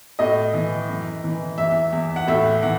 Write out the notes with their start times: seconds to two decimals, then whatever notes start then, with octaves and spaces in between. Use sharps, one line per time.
0.19 A2 D#5
0.54 E3
0.89 F#2
1.24 E3
1.58 E2 E5
1.93 E2
2.16 F#5
2.27 A2 E5
2.63 E3 F#5